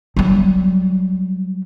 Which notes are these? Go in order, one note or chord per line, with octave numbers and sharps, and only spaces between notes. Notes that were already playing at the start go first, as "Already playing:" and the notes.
F#3 G3